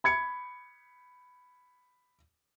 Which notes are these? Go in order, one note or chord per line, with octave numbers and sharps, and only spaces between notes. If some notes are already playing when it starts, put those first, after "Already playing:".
B5 G#6 C#7